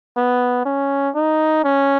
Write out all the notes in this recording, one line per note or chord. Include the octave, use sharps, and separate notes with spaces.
B3
C#4
D#4
C#4